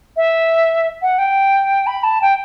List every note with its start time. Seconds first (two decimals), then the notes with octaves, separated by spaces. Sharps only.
0.17 E5
1.02 F#5
1.18 G5
1.87 B5
2.03 A5
2.22 G5